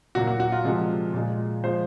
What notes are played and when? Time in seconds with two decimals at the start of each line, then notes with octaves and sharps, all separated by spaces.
0.15 A#2 F#3 A#3 F#4
0.27 F#4
0.40 F#4
0.52 F4
0.64 C3 F3 G#3
1.14 A#2 G#3
1.64 F3 G#3 C5